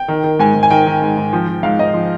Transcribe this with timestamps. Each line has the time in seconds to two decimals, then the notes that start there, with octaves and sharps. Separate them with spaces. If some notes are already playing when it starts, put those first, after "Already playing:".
Already playing: G5
0.08 D#3
0.24 D#3
0.40 G#2 G#5
0.55 G#2
0.63 G#5
0.70 D#3 G5
0.87 D#3
1.02 G#2
1.17 G#2
1.33 F3
1.48 F3
1.63 G#2 F5
1.79 G#2 D#5
1.94 F3